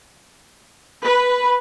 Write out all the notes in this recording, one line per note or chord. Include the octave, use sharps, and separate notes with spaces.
B4